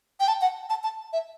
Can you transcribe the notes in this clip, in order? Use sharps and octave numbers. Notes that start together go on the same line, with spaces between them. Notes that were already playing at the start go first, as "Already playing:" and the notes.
G5
A5
F#5
A5
A5
E5